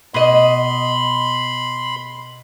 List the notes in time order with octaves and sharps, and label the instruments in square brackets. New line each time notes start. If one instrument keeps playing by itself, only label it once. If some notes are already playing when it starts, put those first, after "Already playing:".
[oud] B2 D#5 [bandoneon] B5 C6